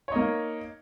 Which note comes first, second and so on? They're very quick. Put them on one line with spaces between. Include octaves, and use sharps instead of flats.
C#5 D#4 A#3